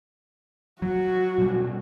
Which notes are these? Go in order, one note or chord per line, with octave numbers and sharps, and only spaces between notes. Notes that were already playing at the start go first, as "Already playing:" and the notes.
F#3 F#4
B2 G3